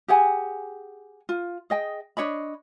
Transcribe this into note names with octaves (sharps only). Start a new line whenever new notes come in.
G4 G#4 F#5 G#5
F4
G#4 D#5 G5
D4 C#5 D#5 B5